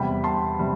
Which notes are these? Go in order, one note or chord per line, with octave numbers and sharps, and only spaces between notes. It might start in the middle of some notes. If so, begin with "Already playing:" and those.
Already playing: E2 C3 G3 G5 B5
A5 C6
C3 G3